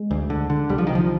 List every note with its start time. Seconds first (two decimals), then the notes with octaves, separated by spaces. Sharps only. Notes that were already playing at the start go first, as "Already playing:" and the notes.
Already playing: G#3
0.11 D2
0.30 D3
0.50 D3
0.69 C2 G3
0.78 F3
0.87 C2 D#3
0.95 F3